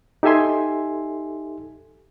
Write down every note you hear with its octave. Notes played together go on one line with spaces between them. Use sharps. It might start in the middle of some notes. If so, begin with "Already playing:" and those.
D#4 G4 A4 E5 G#5 C6